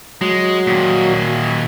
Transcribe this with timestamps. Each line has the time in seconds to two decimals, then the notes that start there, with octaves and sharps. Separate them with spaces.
0.21 F#3 G#3
0.67 A#2 D#3